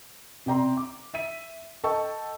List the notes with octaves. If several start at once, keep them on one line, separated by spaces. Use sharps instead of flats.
C3 D5 G5 A#5 C6
D6
E5 B6 D#7
A4 D#5 G5 A5 C#6 E6